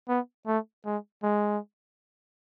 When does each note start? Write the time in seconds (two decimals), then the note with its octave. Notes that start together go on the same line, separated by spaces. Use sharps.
0.08 B3
0.47 A3
0.85 G#3
1.24 G#3